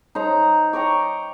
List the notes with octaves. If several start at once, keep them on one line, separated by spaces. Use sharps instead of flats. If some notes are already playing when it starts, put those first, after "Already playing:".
D#4 C5 A#5
G5 A#5 C#6 D6